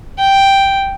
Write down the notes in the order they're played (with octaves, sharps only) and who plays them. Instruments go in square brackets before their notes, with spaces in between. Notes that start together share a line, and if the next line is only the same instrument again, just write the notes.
[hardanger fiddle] G5